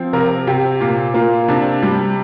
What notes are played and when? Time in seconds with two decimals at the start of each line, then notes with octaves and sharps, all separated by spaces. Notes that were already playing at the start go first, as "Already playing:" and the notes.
Already playing: F3 C4
0.13 C3 A#4
0.47 C3 G4
0.80 A#2 F4
1.14 A#3 F4
1.48 C3 D4
1.82 G3